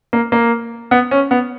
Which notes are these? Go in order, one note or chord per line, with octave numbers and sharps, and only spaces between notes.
A#3
A#3
B3
C#4
B3